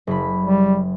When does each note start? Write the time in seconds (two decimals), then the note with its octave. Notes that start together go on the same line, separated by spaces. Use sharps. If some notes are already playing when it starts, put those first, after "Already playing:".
0.07 F#1 B5
0.44 G3